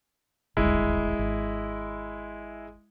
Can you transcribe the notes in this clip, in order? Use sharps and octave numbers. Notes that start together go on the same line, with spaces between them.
D#1 G#1 D2 G#3 E4
G#1